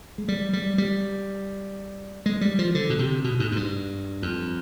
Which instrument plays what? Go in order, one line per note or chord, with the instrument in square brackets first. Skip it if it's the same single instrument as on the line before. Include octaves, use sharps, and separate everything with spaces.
[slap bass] G#3
G3
G3
G3
G#3
G3
F3
D3
B2
C3
B2
G#2
G#2
G2
F2